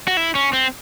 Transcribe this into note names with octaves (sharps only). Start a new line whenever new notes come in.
F#4
E4
C#4
C4